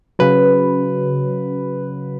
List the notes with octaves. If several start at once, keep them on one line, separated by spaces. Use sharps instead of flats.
C#3 F#3 B4